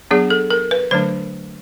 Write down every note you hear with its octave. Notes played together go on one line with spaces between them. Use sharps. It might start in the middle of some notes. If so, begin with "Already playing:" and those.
F#3 B3 D4 G#4
A4
A#4
B4
D3 F#3 A3 D4 C5